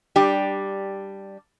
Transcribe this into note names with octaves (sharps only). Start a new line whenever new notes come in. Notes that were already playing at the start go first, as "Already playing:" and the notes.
G3 D4 G4